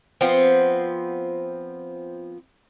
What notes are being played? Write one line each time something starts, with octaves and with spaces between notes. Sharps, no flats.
F3 B3 C4